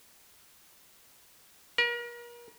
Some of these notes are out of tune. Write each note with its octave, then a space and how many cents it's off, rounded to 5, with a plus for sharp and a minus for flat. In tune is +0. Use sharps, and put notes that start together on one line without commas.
A#4 +40